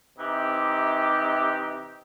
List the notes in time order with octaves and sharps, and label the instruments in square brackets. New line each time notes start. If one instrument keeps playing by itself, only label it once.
[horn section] C3 E3 D#4 G4